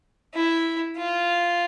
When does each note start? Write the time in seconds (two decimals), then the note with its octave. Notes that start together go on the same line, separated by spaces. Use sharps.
0.35 E4
0.97 F4